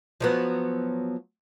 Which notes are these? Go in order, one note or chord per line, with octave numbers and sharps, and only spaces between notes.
F3 F#3 B3